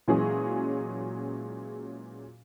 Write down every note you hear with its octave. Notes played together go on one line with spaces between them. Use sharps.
A#2 E3 F#3 G#3 C#4 G#4